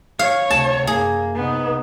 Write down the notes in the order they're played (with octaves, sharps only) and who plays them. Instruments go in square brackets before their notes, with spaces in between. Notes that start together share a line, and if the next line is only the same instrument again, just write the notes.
[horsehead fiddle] C#5 [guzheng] F5
[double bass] D2 C3 [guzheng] A5
[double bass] F#2 [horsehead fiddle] A#3 [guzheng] G#4
[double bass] C3 D#4 [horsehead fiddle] B3